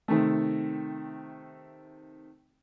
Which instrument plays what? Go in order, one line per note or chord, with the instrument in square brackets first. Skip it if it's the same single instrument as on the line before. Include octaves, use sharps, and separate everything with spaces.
[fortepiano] C3 D#3 A3